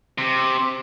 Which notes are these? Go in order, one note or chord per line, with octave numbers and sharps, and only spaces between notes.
C3